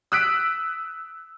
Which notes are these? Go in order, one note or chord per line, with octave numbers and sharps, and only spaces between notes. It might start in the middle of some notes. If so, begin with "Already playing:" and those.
D#6 E6 F#6 B6 D7